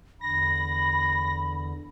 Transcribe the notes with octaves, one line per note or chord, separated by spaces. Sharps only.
E2 D3 B5 A#6